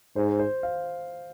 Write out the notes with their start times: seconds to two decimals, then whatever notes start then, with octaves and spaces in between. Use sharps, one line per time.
0.16 G#2 C5
0.39 C5
0.63 F5